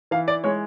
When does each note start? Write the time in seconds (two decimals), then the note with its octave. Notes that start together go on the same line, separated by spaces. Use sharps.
0.11 E3 F5
0.28 D5
0.44 G#3 C#5